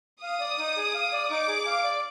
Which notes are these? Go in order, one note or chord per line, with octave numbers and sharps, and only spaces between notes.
F5 D#6
D5
D#4
G#4
F5
D5
D#4 D6
G#4
F5
D5